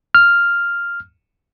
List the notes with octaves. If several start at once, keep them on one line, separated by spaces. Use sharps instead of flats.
F6